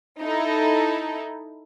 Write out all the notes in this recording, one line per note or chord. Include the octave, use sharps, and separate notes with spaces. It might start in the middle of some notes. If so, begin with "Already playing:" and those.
D#4 E4 A4